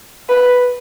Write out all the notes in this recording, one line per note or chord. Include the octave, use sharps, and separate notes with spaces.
B4